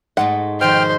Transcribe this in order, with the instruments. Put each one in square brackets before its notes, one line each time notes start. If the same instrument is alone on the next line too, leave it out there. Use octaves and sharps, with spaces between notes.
[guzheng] G#2 G#3 A3 [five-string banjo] F#5
[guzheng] B2 D#3 F3 [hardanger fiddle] C5 [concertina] G5 F6